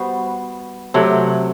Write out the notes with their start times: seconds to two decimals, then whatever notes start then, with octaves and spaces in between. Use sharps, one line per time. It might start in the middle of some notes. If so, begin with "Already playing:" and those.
Already playing: G3 B3 F#4 C5
0.94 C3 F#3 A3